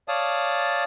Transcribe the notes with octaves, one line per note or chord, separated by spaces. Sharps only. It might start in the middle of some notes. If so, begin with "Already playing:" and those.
C#5 D5 F5 A5 D#6